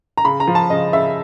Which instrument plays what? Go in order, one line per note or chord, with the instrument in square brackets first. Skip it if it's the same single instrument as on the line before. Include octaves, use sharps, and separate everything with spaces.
[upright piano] A#5
C#3 B5
A#5
F3
A5
C#3 D#5
C#3 E5